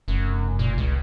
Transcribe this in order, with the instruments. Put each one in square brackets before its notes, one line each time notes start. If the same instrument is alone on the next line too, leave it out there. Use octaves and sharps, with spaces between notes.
[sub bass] F1 [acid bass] F#2
[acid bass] A#2
C#2